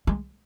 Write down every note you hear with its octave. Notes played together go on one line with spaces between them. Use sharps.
G#3